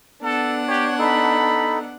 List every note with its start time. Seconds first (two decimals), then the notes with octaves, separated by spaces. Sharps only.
0.22 B3 D4 A4 F#5
0.68 G4 C#5
0.99 D#4 A4 B5